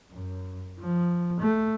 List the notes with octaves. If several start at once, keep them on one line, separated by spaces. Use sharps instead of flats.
F#2
F3
A3